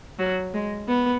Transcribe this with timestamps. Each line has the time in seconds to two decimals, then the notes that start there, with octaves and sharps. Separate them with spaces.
0.19 F#3
0.54 G#3
0.88 B3